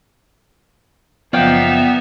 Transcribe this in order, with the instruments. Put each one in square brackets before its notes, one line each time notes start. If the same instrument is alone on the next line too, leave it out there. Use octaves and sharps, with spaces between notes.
[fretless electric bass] F#1 F3 [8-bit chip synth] B3 [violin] D#4 E5 [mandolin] D5 F5 G5